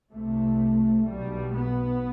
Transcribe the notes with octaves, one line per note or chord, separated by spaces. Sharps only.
C2 C3 A3
B1 B2 G3
B3